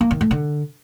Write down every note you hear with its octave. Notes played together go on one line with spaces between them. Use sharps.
A#3
D#3
A3
D3